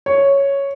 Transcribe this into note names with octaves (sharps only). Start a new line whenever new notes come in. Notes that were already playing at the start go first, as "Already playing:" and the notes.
C#5